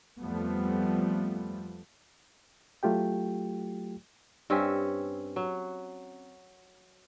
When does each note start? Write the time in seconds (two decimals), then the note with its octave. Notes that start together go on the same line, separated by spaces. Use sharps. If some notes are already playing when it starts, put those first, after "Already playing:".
0.20 F2 F3 G3 A3 B3
2.83 F#3 A3 F4 G4 G5
4.50 G2 C4 C#4 E5
5.36 F#3